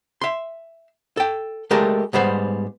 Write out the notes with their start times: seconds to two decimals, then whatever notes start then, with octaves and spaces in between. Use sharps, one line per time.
0.21 E5 C6
1.17 A4 G5
1.71 G#3 A3 G4 A4 A#4 D5
2.13 G#2 G3 B3 C5